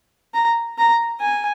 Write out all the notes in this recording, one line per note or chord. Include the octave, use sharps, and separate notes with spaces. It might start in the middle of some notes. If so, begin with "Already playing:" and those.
A#5
A#5
G#5